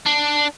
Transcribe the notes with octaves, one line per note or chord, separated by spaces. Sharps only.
D4